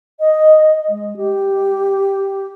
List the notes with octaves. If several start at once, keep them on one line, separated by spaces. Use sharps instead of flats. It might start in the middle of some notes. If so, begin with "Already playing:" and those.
D#5
G#3
G4